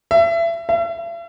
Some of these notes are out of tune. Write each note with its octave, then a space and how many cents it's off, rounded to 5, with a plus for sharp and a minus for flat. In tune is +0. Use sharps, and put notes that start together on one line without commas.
E5 +30
E5 +45